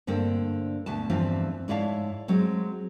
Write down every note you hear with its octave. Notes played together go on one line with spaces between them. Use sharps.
G2 D3 A#3 C4 A4
D2 B2 A5
E2 G2 E3 F3 C4 F4
G#2 E4 C#5 D5 F5 A5
F#3 G#3 C4